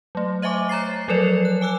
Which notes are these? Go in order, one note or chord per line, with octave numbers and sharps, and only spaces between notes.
F#3 A3
C5 D#5 E5 G#5 C#6 D6
C#5 A#5 A6 C7
F3 F#3 A4 A#4 C#5 D5
F#6
G#5 D6 E6 F#6